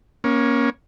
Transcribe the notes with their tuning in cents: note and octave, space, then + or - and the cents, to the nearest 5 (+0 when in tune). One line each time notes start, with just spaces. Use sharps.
A#3 +30 C#4 +0